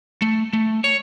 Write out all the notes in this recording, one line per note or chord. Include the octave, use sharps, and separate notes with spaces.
A3
A3
C#5